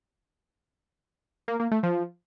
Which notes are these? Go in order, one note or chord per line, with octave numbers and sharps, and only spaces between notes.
A#3
A#3
A3
F3